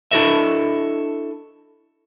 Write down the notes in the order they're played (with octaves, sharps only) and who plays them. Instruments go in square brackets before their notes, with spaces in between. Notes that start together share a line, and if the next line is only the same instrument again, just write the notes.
[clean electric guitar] D4 E4 F#4 A4 D#5 E5